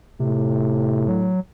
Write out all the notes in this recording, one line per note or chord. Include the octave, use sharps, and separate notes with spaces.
A2 C3
F#3